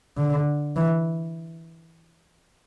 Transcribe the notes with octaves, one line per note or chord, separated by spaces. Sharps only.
D3
E3